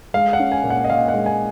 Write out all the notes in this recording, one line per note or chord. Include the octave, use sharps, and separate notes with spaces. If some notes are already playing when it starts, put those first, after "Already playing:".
G#3 F5
F#5
C#4
G#5
A#2
F#5
D#5
A#2 F5
F#5
G#3
G#5